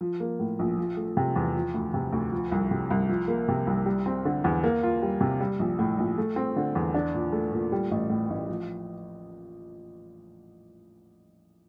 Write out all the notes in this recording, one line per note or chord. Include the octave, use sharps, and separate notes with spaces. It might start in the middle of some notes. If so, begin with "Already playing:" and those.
F3
A#3
A2
A#1
F3
A3
C3
E2
F3
D2
C3
D2
F3
C2
C3
C2
F3
A#3
C3
C2
G3
C4
D3
E2
A#3
F4
G3
C3
G3
A#1
A2
A#1
A3
C4
D3
E2
D4
A#2
A3
A#2
G3
A1
A2
A1
F3